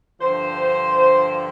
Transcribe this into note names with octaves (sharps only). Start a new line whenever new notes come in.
G2 D3 F3 C5